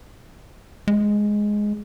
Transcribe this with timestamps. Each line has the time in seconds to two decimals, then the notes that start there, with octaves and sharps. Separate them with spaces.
0.88 G#3